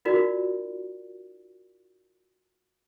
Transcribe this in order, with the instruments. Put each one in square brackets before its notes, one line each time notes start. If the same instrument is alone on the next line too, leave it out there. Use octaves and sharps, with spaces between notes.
[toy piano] D#4 F4 F#4 A#4 D5